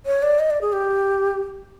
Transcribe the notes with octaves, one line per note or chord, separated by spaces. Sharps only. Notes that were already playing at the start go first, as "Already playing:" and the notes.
C#5
D5
D#5
D5
G#4
G4